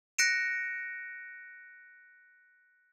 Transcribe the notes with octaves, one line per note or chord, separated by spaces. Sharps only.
F#6 A#6 C#7 D7 E7